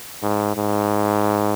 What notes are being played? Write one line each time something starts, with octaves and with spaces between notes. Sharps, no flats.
G#2
G#2